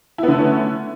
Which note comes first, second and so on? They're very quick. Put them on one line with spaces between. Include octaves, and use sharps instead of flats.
E4 B3 D3 A3 C#4